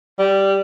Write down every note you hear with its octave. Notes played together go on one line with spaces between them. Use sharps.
G3